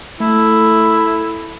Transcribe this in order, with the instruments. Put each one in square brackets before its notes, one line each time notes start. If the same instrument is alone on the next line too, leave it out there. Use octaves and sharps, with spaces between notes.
[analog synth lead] A3 [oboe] E4